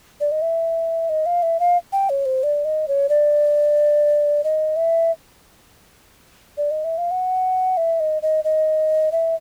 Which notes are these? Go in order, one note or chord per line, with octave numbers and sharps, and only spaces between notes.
D5
D#5
E5
D#5
F5
E5
F5
G5
C#5
C5
D5
D#5
C#5
D5
D#5
E5
D5
D#5
E5
F5
F#5
E5
D#5
D#5
D#5
E5